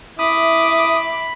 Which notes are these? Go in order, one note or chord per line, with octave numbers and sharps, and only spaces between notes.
E4 E5 B5 D6 D#6